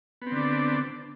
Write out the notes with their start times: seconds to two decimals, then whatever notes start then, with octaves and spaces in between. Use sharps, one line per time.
0.22 B3
0.27 C4
0.31 D3
0.36 D4